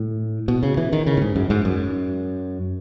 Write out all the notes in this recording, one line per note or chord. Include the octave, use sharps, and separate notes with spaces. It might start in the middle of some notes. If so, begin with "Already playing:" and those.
Already playing: A2
B2
C#3
E3
D#3
C#3
A2
G#2
F#2
G#2
F#2